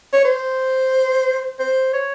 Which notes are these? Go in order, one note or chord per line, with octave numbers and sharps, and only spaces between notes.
C#5
C5
C5
C#5